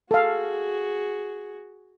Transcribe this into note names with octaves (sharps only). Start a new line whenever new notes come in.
F#4 G#4 A4 F5